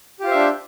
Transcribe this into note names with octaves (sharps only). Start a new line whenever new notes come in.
D4 F4 G4 C5 E5